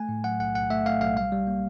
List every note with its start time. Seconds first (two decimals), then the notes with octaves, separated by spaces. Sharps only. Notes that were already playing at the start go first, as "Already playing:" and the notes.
Already playing: A3 G#5
0.09 A2
0.24 F#3 F#5
0.39 B1 F#5
0.55 B1 F#5
0.70 A3 E5
0.85 A3 F5
1.01 B1 F5
1.16 G3 F5
1.32 G3
1.47 A#3